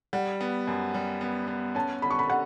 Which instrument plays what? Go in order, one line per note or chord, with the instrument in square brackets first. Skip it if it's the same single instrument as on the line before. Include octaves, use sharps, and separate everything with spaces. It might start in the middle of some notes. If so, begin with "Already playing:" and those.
[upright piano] G3 [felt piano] F#5
[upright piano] B3
F#2
G3
B3
B3
[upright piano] C#4 [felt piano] A5
[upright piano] D3 [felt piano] B5
[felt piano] C#6
B5
[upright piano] D3 [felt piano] F#5